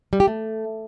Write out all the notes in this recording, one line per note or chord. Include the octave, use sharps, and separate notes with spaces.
G3
G4
A3